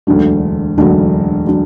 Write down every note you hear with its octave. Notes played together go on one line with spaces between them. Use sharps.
E1 D2 D3 F#3
E1 D2 D3 F#3
D3 F#3